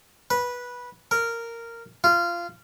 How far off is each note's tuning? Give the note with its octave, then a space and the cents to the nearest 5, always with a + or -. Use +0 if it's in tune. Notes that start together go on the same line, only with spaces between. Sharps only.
B4 -15
A#4 -10
F4 -20